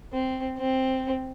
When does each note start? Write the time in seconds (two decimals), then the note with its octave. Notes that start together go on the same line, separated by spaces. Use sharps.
0.13 C4
0.58 C4